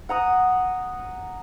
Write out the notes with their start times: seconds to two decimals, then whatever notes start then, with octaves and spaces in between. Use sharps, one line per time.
0.09 F#5 A#5 D#6